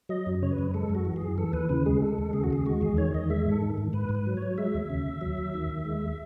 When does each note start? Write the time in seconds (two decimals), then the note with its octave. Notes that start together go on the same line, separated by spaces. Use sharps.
0.09 F#3 D#5
0.26 F#2
0.42 C#3 C#5
0.52 B4
0.58 F#2
0.74 G#3 A4
0.89 F#2
0.95 F#4
1.05 E3
1.16 G#4
1.22 F#2
1.38 E3 A4
1.53 D#2 B4
1.69 C#3 B4
1.86 G#3 G#4
2.02 G#3 A4
2.18 D#2
2.33 C#3 G#4
2.44 F#4
2.50 D#2 G#4
2.66 G#3 F#4
2.81 E2 G#4
2.97 D#3 C#5
3.14 E2 D#5
3.30 G#3 E5
3.46 G#2 A4
3.62 D#3
3.78 G#2
3.93 G#2 B4
4.09 G#2
4.15 B4
4.26 F#3
4.37 C#5
4.42 F#3
4.58 G#3 E5
4.74 D#2
4.90 C#3
5.06 D#2
5.21 F#3
5.38 D#2
5.54 D#3
5.70 D#2
5.85 G#3